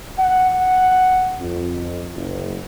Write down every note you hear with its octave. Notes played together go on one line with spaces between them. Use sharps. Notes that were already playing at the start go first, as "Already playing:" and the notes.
F#5
F2
F#1